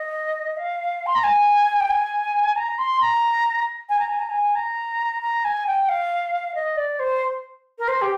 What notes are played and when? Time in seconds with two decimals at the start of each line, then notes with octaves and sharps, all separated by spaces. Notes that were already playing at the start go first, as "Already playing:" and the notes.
Already playing: D#5
0.57 F5
1.06 C6
1.14 A#5
1.23 G#5
1.80 G5
1.89 G#5
2.56 A#5
2.78 C6
3.00 A#5
3.89 G#5
3.99 A#5
4.09 G#5
4.19 A#5
4.29 G#5
4.55 A#5
5.22 A#5
5.44 G#5
5.66 G5
5.88 F5
6.54 D#5
6.76 D5
6.99 C5
7.78 A#4
7.88 C5
8.01 G4